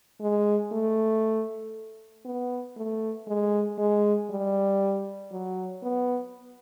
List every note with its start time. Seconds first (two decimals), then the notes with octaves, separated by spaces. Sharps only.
0.20 G#3
0.72 A3
2.25 B3
2.77 A3
3.27 G#3
3.78 G#3
4.30 G3
5.32 F#3
5.83 B3